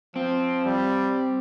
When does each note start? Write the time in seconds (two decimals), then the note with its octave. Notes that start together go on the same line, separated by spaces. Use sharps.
0.16 F3 C4
0.65 G3